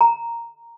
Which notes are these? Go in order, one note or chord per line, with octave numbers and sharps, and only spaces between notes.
A#5